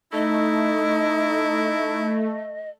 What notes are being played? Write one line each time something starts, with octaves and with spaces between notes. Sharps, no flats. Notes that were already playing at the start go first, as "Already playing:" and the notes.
A3 D#4 E4 D#5